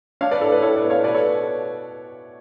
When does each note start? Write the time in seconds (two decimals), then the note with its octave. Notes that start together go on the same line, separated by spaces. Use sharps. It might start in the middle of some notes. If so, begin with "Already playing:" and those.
0.21 D4 C#5 F5
0.31 B4 D5
0.41 A2 A4
0.52 B4
0.62 A2 A4 C#5
0.76 B4 D5
0.83 B3
0.90 C#5 F5
1.04 B2 B4 D5
1.14 A4 C#5